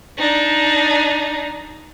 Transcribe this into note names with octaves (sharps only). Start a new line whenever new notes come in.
D4 D#4